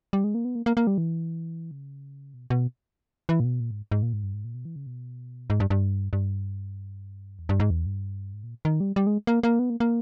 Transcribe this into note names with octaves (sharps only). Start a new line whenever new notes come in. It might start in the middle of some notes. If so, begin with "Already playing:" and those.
G3
G#3
A#3
B3
A#3
A#3
A#3
G3
E3
C#3
B2
B2
E3
A#2
B2
A#2
G#2
G#2
A#2
G#2
G2
G#2
A#2
B2
E3
C#3
B2
G#2
G2
G2
G2
E2
G2
G#2
E2
G2
G#2
A#2
D#3
G3
G3
G#3
A#3
A#3
B3
A#3
A#3